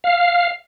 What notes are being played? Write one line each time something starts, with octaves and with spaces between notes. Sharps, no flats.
F5